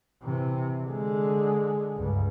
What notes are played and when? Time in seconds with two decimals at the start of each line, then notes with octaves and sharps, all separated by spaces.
0.22 C3 E3
0.83 D3 G#3
1.95 C#2 G2